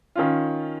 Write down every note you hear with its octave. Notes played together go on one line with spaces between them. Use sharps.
D#3 C#4 F4